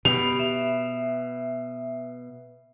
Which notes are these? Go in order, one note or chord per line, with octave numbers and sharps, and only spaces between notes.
B2 G4 B5 F7
E5